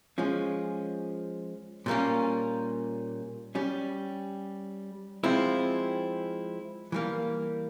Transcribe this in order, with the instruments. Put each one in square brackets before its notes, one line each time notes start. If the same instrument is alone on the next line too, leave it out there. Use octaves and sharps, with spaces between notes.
[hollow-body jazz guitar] F3 G#3 C#4
A#2 G3 A#3 C#4
G3 C#4 G4
F3 G#3 C4 E4
E3 G3 A#3